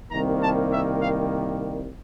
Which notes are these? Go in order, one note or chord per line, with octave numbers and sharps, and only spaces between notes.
C2 C3 D#3 G3 A#3 A#5
A5
E5
F5